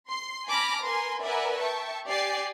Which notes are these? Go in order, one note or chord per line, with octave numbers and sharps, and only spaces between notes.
C6 C7
G#5 A5 B5 D6 F6 A#6
A#4 B4 G#5 C6
A#4 B4 D5 E5 F#5 G#5
E5 G5 A5 C#6
G4 D5 G#5 A6 C7